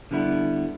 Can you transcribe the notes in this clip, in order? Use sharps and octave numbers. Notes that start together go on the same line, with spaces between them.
D3 G3 B3 E4